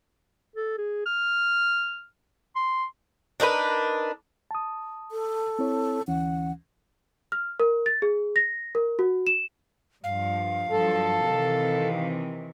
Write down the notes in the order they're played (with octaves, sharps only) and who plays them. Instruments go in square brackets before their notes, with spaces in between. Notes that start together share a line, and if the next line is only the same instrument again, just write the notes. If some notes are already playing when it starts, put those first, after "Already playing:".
[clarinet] A4
G#4
F6
C6
[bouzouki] D4 D#4 A#4 B4
[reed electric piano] A5 D#6
[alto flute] A4
[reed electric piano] C4 E4 C#5
[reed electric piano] D2 E3 C#4 [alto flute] F#5
[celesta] F6
A#4
A6
G#4
A#6
A#4
F#4
E7
[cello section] G2 F3 [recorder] F5
[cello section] G2 F3 F#3 [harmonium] A4
[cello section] C3 D#3 E3